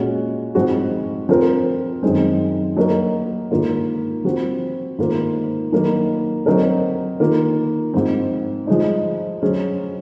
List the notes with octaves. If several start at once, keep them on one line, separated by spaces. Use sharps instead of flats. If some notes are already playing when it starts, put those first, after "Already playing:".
Already playing: A#2 G#3 C#4 F#4
G#2 F3 G#3 C4 F#4
F3 C4 F4 A#4
F#2 D#3 G#3 C4
F#3 A#3 D#4 A#4
G#2 D#3 A#3 F4
F3 C4 F#4 C5
G#2 D#3 A#3 F4 C5
D#3 F#3 A#3 D#4
F#3 C4 D#4 A#4
D#3 A#3 F4
G#2 F3 C4
F3 G#3 D#4
F#3 C#4 G#4 C5